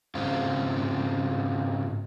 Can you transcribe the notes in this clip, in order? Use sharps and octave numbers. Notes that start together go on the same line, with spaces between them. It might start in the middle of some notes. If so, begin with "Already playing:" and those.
G#2 C#3 C4 F4